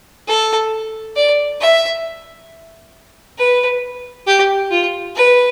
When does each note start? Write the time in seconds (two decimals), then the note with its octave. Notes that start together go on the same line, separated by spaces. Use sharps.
0.27 A4
1.16 D5
1.60 E5
3.38 B4
4.27 G4
4.71 F4
5.16 B4